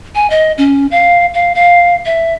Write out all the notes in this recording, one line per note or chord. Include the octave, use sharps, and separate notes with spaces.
G#5
D#5
C#4
F5
F5
F5
E5